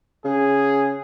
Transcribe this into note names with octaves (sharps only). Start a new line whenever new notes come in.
C#3 G#4